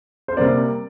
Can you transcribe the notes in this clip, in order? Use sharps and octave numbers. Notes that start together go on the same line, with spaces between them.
C5
C3 G3 A#3 D5